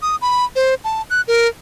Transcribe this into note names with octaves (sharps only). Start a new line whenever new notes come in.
D#6
B5
C5
A5
F#6
A#4